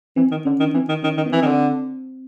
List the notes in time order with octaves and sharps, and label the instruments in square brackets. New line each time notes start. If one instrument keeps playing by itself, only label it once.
[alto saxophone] E3 [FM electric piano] C4
[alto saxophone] D#3
[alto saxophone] D3 [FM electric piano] C#4
[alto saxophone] D#3 [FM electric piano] D4
[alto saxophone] E3 [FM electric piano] C4
[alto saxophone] D#3
[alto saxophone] D#3 [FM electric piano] C#4
[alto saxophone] D#3
[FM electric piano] B3
[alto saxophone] E3 [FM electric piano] C4
[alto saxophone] D#3
D3